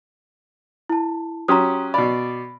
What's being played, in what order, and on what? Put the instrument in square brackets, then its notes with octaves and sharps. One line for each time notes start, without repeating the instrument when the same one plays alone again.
[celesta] E4 A5
[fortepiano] F#3 C#4 G4 [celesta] A#5 C6 D#6
[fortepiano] B2 D5 [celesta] B5